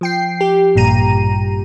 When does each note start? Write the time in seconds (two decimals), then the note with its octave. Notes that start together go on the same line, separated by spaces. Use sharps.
0.01 F3 G5 C7
0.41 G4
0.75 A1 G2 A#2 A#5 D#7